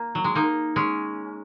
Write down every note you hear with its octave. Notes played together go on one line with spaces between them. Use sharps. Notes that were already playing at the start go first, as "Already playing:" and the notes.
Already playing: A#3
F#3
G#3
A#3 D#4
G#3 C#4